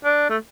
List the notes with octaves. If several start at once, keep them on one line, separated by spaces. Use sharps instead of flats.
D4
A3